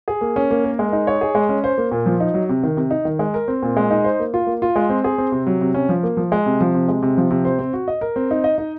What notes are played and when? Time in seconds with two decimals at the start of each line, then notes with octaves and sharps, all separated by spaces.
0.08 G#4
0.21 A#3
0.36 C#4
0.51 A#3
0.64 A#4
0.79 G#3
0.93 D#4
1.07 C#5
1.21 G#4
1.35 G#3
1.49 C#4
1.64 C5
1.78 A#3
1.92 A#2
2.06 F3
2.20 D#4
2.34 F#3
2.49 C3
2.63 D#3
2.77 C3
2.91 D#4
3.05 D#3
3.19 G#3
3.34 A#4
3.48 C4
3.63 A#2
3.77 G#3
3.91 D#4
4.04 C5
4.20 A#3
4.34 F4
4.47 A#3
4.62 F4
4.76 G#3
4.90 C4
5.04 G#4
5.18 C4
5.32 C3
5.47 F#3
5.61 C3
5.74 C#4
5.89 F3
6.03 A#3
6.17 F3
6.32 G#3
6.46 C3
6.61 F3
6.74 C3
6.88 G#3
7.02 C3
7.17 F3
7.31 C3
7.45 C5
7.59 C4
7.73 F#4
7.88 D#5
8.01 A#4
8.16 C4
8.31 D#4
8.44 D#5
8.58 D#4